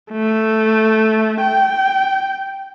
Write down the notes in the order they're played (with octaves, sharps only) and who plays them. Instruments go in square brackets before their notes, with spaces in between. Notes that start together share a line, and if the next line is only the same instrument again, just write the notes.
[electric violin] A3
G5